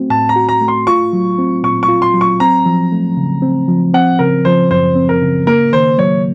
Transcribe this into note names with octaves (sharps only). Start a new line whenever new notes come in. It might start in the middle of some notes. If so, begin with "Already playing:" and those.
Already playing: A3 C4 F#4
A2 A5
A#5
F#4
A#5
A3
C6
F4 C#6
F#3
C4
A#2 C#6
C#6
F4
C6
F#3
C#6
C4 A#5
F3
A3
C#3
C4
F3
C4 F#5
C#3 A#4
F3 C5
F#2 C5
C4
A#4
C#3
A#3 A#4
D#3 C5
F#3 C#5